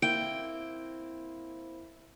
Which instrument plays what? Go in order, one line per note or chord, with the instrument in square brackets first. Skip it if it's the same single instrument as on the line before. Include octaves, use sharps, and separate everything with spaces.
[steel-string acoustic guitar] A#3 C4 E4 [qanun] G5